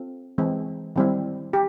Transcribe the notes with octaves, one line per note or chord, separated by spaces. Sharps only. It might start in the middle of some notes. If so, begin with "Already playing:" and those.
Already playing: C4 F4 A4
E3 G#3 C4
D#3 G3 C4 E4
G4